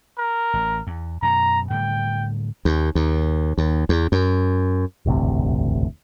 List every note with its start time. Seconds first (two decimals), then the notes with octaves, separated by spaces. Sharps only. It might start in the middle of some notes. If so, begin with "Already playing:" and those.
0.18 A#4
0.54 A1
0.87 E2
1.22 F#2 B2 A#5
1.70 A2 D3 G3 G5
2.65 D#2
2.95 D#2
3.58 D#2
3.89 E2
4.12 F#2
5.06 E1 A1 D2 C3